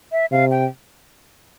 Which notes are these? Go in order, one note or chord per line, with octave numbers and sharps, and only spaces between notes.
E5
C3 F5
G5